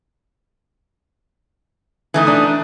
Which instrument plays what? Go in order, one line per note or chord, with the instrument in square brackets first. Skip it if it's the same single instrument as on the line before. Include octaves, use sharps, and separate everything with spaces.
[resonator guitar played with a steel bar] E3 A3 D#4
[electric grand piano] D4 D#6